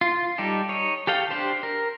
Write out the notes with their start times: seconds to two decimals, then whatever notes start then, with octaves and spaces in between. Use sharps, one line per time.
0.01 F4
0.38 G3 D#4 G4 A4
0.69 D#4 C#5
1.07 G4 A4 F5 G5
1.31 D4 G4 C5
1.63 A#4